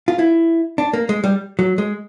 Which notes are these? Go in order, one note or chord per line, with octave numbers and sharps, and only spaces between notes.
F4
E4
D4
A#3
G#3
G3
F#3
G#3